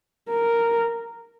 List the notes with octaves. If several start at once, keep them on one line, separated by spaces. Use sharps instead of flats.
A#4